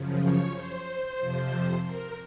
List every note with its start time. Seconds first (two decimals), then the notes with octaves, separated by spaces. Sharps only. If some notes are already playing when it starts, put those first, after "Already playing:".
Already playing: F#2 C#3 F3
0.20 C#5
0.53 C5
1.19 F2 C3 F3
1.85 A#4